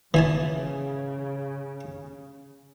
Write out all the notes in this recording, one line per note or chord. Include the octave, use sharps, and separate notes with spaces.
C#3 E3 G#5 A5